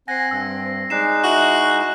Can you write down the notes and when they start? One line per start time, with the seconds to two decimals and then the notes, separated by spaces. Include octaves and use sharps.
0.08 C4 F#5 G#5 A#6 C7
0.31 G2 E6
0.90 G#3 D#4 D5 F#6 C7 E7
1.24 E4 F#4